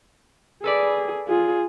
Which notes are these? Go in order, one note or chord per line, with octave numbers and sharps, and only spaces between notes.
G#4 A4 B4 D5
F4 G#4